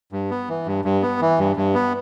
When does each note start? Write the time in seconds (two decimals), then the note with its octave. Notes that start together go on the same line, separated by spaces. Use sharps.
0.12 G2
0.30 B3
0.49 E3
0.66 G2
0.85 G2
1.02 B3
1.21 E3
1.39 G2
1.56 G2
1.74 B3